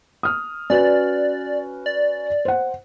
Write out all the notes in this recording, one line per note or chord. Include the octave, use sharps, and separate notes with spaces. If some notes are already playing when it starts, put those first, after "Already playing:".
D#6 F6
C#4 F#4 B4 D5
D5
C5 F#5